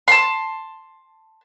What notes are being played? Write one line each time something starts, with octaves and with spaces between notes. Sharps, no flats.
A5 C6